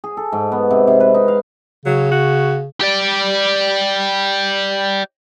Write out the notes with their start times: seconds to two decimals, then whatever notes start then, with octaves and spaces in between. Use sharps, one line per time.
0.04 G#4
0.17 A4
0.32 G#2
0.52 B3
0.70 C3
0.87 C3
1.00 B4
1.14 D#4
1.28 F5
1.86 C#3 F#3
2.11 F#4
2.80 G4 D5